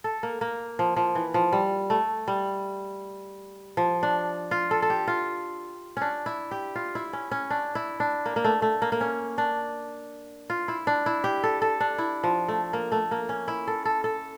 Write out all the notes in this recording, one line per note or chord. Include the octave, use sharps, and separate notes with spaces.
A4
A#3
A#3
F3
F3
E3
F3
G3
A3
G3
F3
D4
F4
A4
A4
G4
F4
C#4 D4
E4
G4
F4
E4
C#4
C#4
D4
E4
D4
A#3
A#3
A3
A3
A#3
A#3
C#4
D4
F4
E4
D4
E4
G4
A4
A4
D4
E4
F3
A3
A#3
A3
A#3
C#4
E4
A4
A4
A4